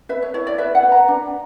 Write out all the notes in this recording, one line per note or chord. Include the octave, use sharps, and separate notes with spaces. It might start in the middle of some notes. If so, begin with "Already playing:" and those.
B4 E5
C#5
E4 C#5
D5
B4 E5
F#5
B4
A#5
D4